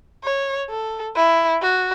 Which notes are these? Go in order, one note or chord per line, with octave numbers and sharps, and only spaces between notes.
C#5
A4
E4
F#4